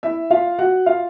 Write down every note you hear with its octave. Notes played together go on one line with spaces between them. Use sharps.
E4 E5
F4 F5
F#4 F#5
F4 F5